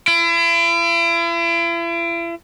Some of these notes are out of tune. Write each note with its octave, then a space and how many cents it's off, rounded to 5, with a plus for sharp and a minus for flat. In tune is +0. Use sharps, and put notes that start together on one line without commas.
E4 +40